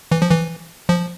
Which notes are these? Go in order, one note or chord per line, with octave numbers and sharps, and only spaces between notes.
E3
F3
E3
F3